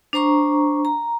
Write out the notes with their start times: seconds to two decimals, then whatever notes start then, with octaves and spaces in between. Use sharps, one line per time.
0.13 D4 C5 A#5 C#6
0.85 A#5